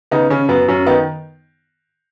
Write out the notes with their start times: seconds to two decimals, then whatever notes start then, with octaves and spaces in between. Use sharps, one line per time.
0.11 C#3 B3 D#4
0.30 C#3 C#4
0.49 F#2 B3
0.68 F#2 C#4
0.86 D#3 B3 D#4